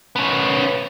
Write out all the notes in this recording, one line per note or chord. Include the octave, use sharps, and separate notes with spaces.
B3 C#4